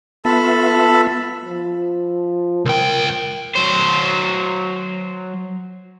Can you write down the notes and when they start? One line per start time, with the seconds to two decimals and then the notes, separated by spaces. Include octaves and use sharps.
0.25 B3 F4 A4 E5 A5 B5
1.45 F3
2.65 C#2 A#4 G5
3.55 F#3 C5